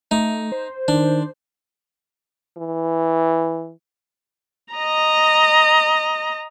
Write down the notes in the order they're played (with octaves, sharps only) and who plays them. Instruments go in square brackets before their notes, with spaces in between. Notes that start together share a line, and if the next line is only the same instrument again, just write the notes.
[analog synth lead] A3 [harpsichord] D#4
[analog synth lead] C5
[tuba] D#3 [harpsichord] D4
[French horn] E3
[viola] D#5 A#5